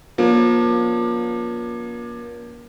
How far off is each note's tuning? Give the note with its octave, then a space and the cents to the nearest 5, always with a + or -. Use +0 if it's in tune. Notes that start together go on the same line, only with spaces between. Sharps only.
F3 +30 A#3 +35 C#4 +40